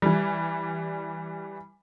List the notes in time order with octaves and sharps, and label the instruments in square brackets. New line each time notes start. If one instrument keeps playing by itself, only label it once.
[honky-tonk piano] E3 G3